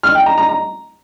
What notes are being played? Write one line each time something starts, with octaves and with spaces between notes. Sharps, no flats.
F6
G5
A#5
A#5
A#5